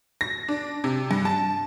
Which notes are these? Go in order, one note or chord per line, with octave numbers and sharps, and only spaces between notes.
A#6
D4
C3
G2
A5